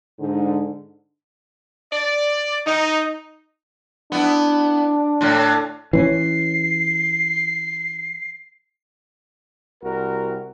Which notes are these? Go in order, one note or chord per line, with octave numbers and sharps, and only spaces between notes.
G#2 D3
D5
D#4
B3 D4 E4
A2 D3
E3 C4 C#4 C7
C2 F#4 A#4